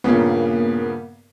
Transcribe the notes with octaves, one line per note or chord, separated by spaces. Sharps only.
G2 A#2 C#3 A#3 B3